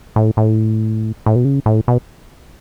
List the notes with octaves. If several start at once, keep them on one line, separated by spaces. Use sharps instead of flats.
A2
A2
A2
B2
C#3
A2
B2